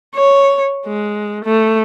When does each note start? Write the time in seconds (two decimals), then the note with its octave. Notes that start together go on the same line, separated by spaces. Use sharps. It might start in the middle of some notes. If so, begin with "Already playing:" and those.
0.15 C#5
0.86 G#3
1.44 A3